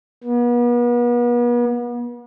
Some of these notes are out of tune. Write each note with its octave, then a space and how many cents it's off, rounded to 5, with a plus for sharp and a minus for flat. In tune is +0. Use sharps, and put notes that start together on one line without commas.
B3 -40